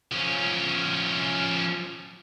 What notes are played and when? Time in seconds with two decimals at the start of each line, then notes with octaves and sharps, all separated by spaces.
0.12 F3 C#4